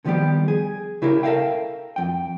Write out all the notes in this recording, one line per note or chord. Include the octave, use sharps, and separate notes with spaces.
D3 D#3 F3 G3 B3 G4
G#4
C#3 E4 G4 A#4
A4 A#4 D5 E5 F5 G5
F2 G5